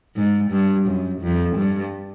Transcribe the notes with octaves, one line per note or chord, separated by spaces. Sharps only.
G#2
G2
F#2
F2
G2